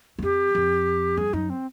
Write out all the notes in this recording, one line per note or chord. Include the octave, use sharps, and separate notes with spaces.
E2
F2 G4
F2
G2 G#4
F#2 D#4
C4